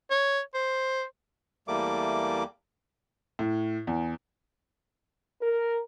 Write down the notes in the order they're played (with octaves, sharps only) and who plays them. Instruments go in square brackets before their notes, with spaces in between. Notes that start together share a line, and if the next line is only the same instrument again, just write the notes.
[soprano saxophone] C#5
C5
[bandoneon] E2 G3 A3 A#3 D6
[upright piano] A2
E2
[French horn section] A#4